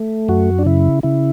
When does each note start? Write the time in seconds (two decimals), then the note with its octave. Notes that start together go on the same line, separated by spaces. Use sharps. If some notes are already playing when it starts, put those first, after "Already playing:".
Already playing: A3
0.28 F#2 F#4
0.59 D4
0.65 C#3 E4
1.03 C#3 E4